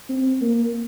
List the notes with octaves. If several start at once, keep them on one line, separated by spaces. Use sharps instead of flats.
C4
A#3